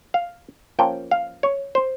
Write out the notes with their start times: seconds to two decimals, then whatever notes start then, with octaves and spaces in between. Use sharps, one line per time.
0.14 F5
0.79 F3 A#3 C#4 G5
1.11 F5
1.43 C#5
1.75 C5